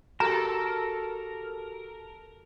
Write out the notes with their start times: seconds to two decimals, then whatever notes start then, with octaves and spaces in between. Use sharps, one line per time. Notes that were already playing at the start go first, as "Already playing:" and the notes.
0.20 F#4 G4 A4 A#4 A#5